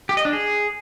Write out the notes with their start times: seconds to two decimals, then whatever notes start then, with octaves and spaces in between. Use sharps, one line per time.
0.09 G4
0.17 D#5
0.25 D4
0.33 G#4